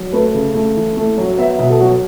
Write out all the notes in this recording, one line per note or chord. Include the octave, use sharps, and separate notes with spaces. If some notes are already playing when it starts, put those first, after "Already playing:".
Already playing: F#3
A3 B4
C#3
A3
E3
A3
F#3
B3 E5
B2 E5
A4
F#3 F#4